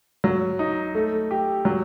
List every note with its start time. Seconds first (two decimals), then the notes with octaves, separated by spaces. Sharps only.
0.24 F#3
0.59 D#4
0.95 A3
1.31 G4
1.65 F#3